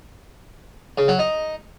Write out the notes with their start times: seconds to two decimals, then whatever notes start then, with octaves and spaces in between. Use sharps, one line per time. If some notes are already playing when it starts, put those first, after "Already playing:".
0.98 C#3
1.08 F#3
1.19 D#4